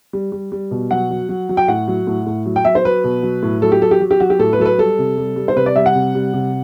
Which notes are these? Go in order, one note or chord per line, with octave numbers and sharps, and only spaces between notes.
G3
G3
G3
B2
F#3 F#5
F#3
F#3
F#3
G5
A2 F#5
F#3
A2
A2
F#3
G5
F#3 E5
C5
F#3 B4
B2
F#3
A2
F#3 A4
G4
F#3 A4
G4
F#3
G4
F#3 F#4
G4
A2 A4
B4
F#3 A4
B4
G3 A4
C3
G3
G3
C5
C3 B4
D5
G3 E5
F#5
C3
G3
C3